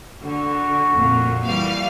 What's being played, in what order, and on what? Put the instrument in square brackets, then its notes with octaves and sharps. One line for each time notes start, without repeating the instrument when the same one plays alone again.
[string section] D3 [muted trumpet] F#4
[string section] F2 A#2
E3 G3 F5